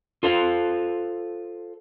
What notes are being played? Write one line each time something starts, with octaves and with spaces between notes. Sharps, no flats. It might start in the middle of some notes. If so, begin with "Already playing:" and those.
F4 A4 C5 F5